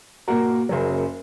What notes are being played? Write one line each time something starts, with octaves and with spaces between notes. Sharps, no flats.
A#2 A#3 F#4 A#4
F#1 F#2 C#3 F#3